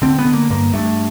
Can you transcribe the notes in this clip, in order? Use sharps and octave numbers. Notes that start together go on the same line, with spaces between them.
D3 C4
B3
D3
A#3
G2 A#3
G2 A3